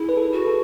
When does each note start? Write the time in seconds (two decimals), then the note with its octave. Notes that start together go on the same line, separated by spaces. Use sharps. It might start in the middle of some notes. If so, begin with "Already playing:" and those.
Already playing: E4 G#4
0.09 B4
0.17 A4
0.32 F#4
0.47 A4